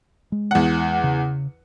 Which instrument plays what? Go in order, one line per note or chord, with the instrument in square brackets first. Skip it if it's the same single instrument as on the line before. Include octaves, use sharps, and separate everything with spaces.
[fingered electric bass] G#3
[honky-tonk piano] E2 F#5
[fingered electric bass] C#3